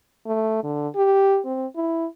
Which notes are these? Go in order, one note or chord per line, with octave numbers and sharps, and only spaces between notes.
A3
D3
G4
C4
E4